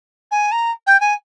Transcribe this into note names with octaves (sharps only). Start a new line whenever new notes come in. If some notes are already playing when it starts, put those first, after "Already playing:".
G#5
A#5
G5
G#5